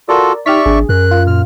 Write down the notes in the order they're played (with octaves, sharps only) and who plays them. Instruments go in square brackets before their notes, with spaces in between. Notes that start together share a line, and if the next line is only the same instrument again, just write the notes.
[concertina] F4 F#4 A4 [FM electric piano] A#4 D5
[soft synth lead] D#4 [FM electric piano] G4 F6 B6 [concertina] D5 E5 C#6
[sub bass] G#1 [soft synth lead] D4 [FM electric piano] G#4
[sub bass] F#2 [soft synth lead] A#4 [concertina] F#6
[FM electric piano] F4
[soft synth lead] A#2 [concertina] F6